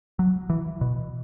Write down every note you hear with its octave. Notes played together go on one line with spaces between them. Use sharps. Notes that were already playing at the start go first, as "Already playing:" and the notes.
F#3
E3
B2